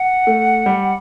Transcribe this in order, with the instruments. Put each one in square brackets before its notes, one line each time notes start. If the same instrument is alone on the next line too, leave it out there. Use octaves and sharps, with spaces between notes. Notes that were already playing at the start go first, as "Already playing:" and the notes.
Already playing: [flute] F#5
[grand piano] A3
G3